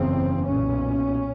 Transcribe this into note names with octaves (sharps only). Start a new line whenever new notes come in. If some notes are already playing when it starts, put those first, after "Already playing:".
Already playing: F#1 E2 C#3 C4
B1 A#2 C#4